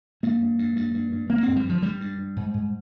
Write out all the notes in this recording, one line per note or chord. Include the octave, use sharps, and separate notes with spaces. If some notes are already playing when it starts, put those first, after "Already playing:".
G2 A#3
G2
G2
G2
G2
G2
G2 A#3
G2 C4
G3
G2 F3
G2 G3
G2
G2
G#2
G#2